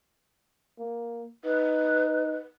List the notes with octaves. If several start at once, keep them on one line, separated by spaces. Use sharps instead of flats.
A#3
D#4 B4